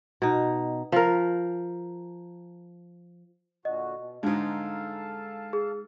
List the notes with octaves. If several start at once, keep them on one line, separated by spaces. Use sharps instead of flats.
B2 D#4
F3 A#4
A#2 D3 F#4 D#5
B2
G#2 D3 G#3 D#4 A4 F5 A5
G#4